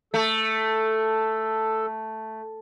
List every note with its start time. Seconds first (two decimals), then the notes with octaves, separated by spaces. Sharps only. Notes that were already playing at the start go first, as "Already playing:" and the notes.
0.14 A3 A4